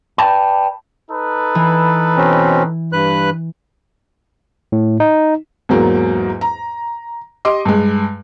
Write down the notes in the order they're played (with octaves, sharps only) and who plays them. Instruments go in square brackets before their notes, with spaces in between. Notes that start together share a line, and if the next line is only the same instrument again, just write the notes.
[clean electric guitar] B4 D5 F5 G5 A5 B5
[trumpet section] D#4 A4 B4
[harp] E3
[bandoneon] B2 C4 C#4
G2 B4 F#6
[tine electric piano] A2
D#4
[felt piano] E2 G#2 F#3 A#3
A#5
G4 D#5 C6 D6
G2 G#3